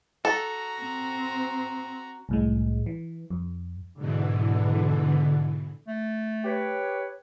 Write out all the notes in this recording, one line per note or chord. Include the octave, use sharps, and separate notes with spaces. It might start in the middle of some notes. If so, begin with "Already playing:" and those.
F#4 A4 A#5
C4
C2 A2 G#3
E3
F2
G#2 B2 D3 E3
A3
G4 B4 C#5